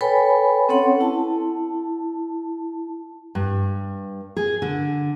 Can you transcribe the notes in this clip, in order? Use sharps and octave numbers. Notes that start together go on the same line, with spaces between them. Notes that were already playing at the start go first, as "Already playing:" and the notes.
A4 B4 C#5 G5 G#5 B5
C4 C#4 A4 C#5 F#5 C6
E4 A5
G2
G#4
D3